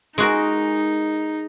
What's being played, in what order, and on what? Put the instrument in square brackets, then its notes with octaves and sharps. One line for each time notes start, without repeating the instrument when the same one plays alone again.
[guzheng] G#3 F#4 A#4 [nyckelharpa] D#4